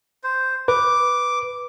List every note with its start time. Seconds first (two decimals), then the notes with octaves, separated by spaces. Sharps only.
0.24 C5
0.68 B4 D6